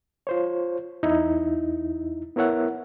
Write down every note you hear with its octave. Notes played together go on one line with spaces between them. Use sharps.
F4 C5 C#5
E2 D#4 E4
B3 E4 A#4 C#5 E5 F#5